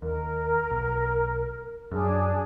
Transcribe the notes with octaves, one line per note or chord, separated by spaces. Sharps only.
D#2 A#4
B1
F#2 D4 G#4